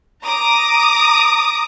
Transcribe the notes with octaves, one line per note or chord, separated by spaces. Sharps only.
A#5 D6 D#6